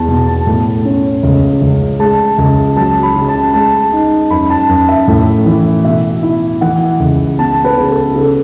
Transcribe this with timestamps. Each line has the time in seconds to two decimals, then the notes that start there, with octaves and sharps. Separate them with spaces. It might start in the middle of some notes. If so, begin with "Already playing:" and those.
Already playing: E2 A5
0.08 B2
0.27 A5
0.47 A2
0.85 C#4
1.23 C#2
1.62 C#2
2.00 G#3 A5
2.38 C#2
2.76 F#3 A5
3.03 B5
3.16 C#3
3.29 A5
3.54 G#3 A5
3.92 D#4
4.30 F#2 B5
4.50 A5
4.69 F#2
4.89 E5
5.08 A2
5.46 E3
5.84 B2 E5
6.23 E4
6.61 E3 F#5
7.00 C#2
7.38 B3 A5
7.65 B4
7.77 C#3
7.89 A4
8.15 C#3 A4